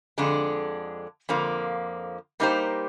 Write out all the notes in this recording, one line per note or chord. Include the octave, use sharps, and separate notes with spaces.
F2 D3 G#3 D4
F2 D3 F3 A#3
G3 A#3 D#4 G4 C5